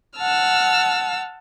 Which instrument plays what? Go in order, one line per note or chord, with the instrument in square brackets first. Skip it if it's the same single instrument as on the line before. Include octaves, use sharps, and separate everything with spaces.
[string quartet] F#5 A5 E6 F6